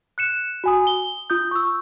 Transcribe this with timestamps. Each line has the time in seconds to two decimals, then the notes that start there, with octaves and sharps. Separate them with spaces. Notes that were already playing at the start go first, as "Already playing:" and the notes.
0.18 F#6 C#7 E7
0.64 F#4 G#5 D#6
0.87 G7
1.30 F4 D#6 G6
1.51 C#6 E6